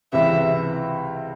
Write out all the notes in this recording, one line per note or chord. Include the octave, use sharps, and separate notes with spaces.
C#2 C3 E3 E5